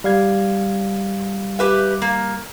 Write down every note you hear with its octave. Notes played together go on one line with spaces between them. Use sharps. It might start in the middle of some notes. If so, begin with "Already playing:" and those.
G3 F5 G#6
G4 B4 E5
A#3